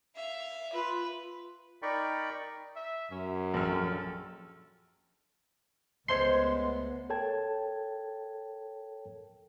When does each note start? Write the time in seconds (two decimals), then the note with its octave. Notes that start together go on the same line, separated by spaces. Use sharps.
0.15 E5 F5
0.72 F4 B4
1.82 D#4 A#4 D5 G5 B5 C#6
2.76 E5
3.11 F#2 C#4
3.54 A#1 A4 F6
6.08 C#2 G#3 A3 B3 C5 C#5 C6
7.10 A4 A#4 C#5 G5 A5 G#6